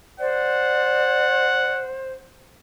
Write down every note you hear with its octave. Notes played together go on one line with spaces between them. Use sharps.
C5 D5 F#5